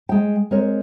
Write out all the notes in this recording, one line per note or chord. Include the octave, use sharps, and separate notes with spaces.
G#3 G5
G#3 C4 A#4 C#5